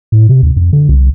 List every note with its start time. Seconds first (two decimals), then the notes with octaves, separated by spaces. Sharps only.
0.12 A2
0.29 C3
0.43 D#2
0.56 F2
0.73 D3
0.89 C2